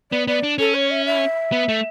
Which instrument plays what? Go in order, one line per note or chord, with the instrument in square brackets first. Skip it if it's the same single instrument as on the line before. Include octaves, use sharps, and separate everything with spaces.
[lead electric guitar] B3 [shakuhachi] D5
[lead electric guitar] B3 [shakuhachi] D5
[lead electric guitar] D4
[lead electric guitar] C#4 [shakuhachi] A4
[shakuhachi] C#5
E5
E5
[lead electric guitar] B3
A3